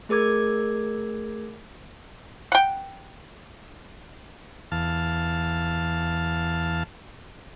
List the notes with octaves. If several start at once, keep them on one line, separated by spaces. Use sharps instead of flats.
A3 G#4 A#4 D6 G#6
F#5 G5
E2 F5 A5